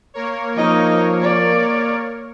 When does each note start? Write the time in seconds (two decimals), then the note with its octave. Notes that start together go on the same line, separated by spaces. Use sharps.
0.14 A#3 A#4 C#5
0.57 F3 D#4 D#5
1.22 D5